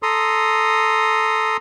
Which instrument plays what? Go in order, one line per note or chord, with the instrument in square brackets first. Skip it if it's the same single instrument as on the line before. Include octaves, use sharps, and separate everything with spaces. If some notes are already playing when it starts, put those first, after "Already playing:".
[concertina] A4 A#5 C6 D#6